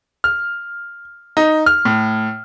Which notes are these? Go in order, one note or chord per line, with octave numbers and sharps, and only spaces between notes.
F6
D#4
F6
A2